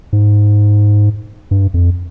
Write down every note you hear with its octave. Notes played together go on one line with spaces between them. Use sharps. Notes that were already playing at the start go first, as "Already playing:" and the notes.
G#2
G2
F2